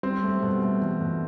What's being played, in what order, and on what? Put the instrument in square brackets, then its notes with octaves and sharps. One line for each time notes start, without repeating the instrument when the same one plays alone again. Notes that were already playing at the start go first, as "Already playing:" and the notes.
[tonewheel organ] G3 [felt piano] C4
[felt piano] A3
[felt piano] B2 [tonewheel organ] G3
[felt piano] A3
[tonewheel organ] E3 [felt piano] A3
[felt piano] B2